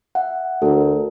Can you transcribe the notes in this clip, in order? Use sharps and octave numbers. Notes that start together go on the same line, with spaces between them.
E5 F#5
D2 A4 A#4